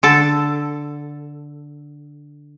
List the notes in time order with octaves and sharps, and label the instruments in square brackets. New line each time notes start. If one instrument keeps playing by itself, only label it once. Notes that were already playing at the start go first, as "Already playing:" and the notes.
[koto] D3 A4